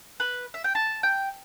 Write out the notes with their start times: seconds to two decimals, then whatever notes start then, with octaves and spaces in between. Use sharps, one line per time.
0.20 B4
0.54 E5
0.64 G5
0.75 A5
1.03 G5